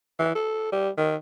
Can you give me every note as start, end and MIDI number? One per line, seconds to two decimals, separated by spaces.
0.19 0.35 52
0.35 0.72 69
0.72 0.90 55
0.98 1.15 51